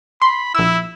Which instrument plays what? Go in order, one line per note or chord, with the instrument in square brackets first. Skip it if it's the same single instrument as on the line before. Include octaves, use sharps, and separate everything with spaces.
[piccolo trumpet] B5 [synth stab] C6
[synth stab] A#1 E6 [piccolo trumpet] E4